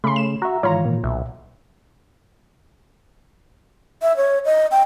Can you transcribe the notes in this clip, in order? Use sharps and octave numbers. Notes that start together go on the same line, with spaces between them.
C#3 A3 B5 C6
E7
F#4 E5 A#5
G#2 D#3 E3 F4 C#5 A#5
A#2
B1 E5
E5
C#5
D#5
G5